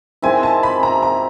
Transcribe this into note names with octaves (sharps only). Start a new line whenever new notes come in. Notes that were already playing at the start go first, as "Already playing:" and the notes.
D#3 G#3 C4 E4 G#5
A5
B5
A#5
A#5